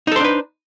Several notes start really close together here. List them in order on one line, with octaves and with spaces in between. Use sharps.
D#4 A4 C5 D4 B4